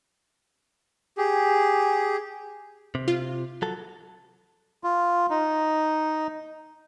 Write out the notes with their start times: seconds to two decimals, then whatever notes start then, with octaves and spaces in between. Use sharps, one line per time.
1.18 G4 G#4
2.95 C3
3.08 F4
3.62 F#3 A4
4.84 F4
5.30 D#4